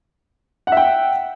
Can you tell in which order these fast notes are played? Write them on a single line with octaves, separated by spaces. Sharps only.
F#5 E5 G5